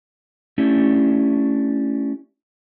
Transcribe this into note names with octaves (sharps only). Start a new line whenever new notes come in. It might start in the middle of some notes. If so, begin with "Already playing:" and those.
A3 C#4 D4 E4 G4